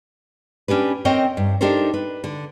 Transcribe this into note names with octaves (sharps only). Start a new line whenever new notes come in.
C#4 D4 G4 B4
C4 A#4 C#5 D#5 G5
G2
D4 D#4 G4 A4 A#4 C5
B4
D3